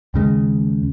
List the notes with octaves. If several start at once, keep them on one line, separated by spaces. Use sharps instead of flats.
D#2 C#3 G#3